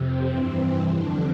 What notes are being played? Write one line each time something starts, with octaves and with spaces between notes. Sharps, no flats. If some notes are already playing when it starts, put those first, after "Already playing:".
Already playing: F2 C3 C4
G2 E3
F2 D3 F3 D4